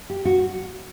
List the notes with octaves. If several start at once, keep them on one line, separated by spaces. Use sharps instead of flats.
G4
F#4